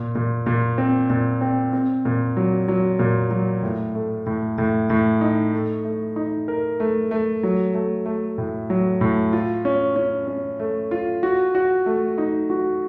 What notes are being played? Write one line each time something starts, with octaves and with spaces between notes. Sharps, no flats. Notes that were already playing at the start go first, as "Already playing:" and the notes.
Already playing: A#2
A#2
A#2
C4
A#2
C4
C4
A#2
F#3
F#3
A#2
F#3
A2
A3
A2
A2
A2
D#4
A3
A3
D#4
A#4
A3
A3
F#3
A3
A3
A2
F#3
A2
F4
C#4
C#4
C#4
A3
F4
F#4
F#4
A3
D#4
F#4